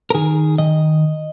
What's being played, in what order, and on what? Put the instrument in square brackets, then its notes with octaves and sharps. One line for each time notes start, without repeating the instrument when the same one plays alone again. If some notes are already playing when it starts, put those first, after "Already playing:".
[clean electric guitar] A#4
D#3 G#4
D#3 D#5